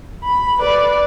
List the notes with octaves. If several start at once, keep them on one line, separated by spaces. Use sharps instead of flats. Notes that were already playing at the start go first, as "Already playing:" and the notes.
B5
B4 D5